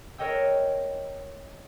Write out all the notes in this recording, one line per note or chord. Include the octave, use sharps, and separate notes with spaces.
A#4 C#5 D#5 G5 E6